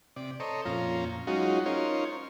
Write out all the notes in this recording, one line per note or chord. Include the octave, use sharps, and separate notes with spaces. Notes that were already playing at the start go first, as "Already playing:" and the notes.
C3 D5
A4 C5 C#5 D#5 A#5
F2 A#2 C#4 F4 A#5
F#3 G#3 C#4 D#4 F4 F#4
C#4 D#4 F4 A#4 C5 C#5